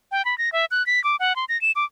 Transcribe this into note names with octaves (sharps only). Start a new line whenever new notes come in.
G5
B5
A#6
E5
F#6
B6
D6
F#5
C6
A#6
E7
D6